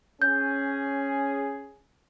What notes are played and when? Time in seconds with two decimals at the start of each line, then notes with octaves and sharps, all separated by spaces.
0.22 C#4 G#4 G6